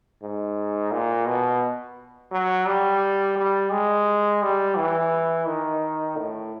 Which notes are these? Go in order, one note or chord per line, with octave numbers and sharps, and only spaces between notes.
G#2
A#2
B2
F#3
G3
G3
G#3
G3
E3
D#3
A2